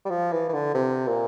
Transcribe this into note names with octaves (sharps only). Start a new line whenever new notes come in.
G3
F3
E3
E3
D3
C3
A#2